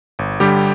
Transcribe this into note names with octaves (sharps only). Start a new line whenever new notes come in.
G1
D3 G3 G4